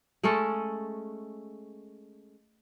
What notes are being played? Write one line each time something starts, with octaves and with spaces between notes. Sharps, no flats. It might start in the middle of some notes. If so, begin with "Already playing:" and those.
G#3 A3 C#4 A4